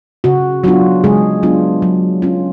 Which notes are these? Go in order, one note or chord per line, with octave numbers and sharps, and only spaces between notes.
C#3 F#4
F#3 B3 D4 F4 F#4
C#3 G#3 G#4
F#3 B3 D4 F4
F#3
C#4 F4